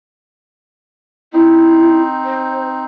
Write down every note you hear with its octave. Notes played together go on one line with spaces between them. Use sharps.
C4 D#4 E4
C5